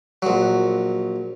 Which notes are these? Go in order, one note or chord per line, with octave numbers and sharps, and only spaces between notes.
A#1 F#3